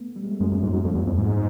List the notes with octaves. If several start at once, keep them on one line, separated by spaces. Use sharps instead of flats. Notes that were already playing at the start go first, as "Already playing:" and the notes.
Already playing: A3 B3
G3
G#3
A3
F#2 G#3 A#3
F#2
G#2
F#2
F2
E2
F2
G#2